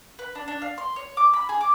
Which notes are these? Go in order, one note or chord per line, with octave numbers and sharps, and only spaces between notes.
B4
D4
D4
F5
C6
C#5
D6
B5
G#4
D6